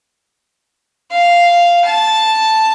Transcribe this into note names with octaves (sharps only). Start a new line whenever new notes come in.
F5
A5